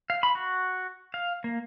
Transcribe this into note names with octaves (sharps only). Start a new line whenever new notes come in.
F5
B5
F#4
F5
A#3